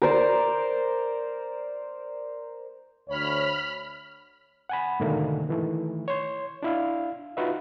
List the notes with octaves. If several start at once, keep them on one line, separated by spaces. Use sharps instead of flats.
A#4 C5 D5
D2 C#5 B5 F6
F#5 G#5 B5
G#2 B2 D3 D#3 A3 A#3
D#3 E3 A3
C#5 C6
D4 E4 F5
D#4 F4 F#4 B4 E5